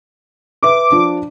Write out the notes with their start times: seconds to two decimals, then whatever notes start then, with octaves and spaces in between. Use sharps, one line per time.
0.63 B4 E5 D6
0.92 F3 D4